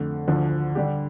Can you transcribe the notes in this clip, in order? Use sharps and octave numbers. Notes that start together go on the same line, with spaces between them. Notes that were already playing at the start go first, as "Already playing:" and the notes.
Already playing: F2 D3 A3
D2 D3 F3
D3 G3 D4 G4